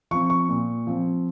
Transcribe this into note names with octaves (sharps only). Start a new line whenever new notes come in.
F3 C4 C#6
C#6
A#2
F3 C4